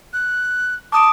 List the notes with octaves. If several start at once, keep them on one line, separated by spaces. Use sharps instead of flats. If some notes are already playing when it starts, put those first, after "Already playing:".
F#6
A5 D6 D#6 D7